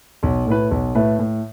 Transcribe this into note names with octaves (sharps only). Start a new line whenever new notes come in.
B1
A2 A3 E4 B4
B1
A2 A3 E4 B4
A2